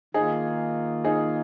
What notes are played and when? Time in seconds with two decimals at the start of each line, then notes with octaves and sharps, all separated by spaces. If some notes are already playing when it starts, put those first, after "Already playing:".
0.14 D#3 A#3 D#4 F4 G#4
1.04 D#4 G#4